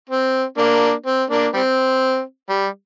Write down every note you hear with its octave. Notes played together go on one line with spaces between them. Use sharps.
C4
A#3 D4
C4
A#3 D4
G3 C4
G3